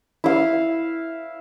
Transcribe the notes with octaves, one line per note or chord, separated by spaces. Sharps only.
E4 F5